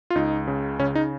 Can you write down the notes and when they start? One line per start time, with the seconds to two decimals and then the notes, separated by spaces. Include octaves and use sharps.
0.10 F4
0.15 C#2 D#4
0.47 C#3
0.80 C#3 C#4
0.95 D#4